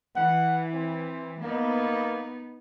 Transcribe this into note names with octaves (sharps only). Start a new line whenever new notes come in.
E3 F#5
C4
A#3 B3 D#4